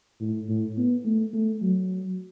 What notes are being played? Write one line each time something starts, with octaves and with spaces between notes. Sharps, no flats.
A2
A2
B3
A3
A3
F#3